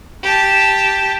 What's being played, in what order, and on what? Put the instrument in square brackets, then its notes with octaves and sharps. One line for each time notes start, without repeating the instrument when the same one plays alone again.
[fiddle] G4 A5